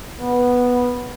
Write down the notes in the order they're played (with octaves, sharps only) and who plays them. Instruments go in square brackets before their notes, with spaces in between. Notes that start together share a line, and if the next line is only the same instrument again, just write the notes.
[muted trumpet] B3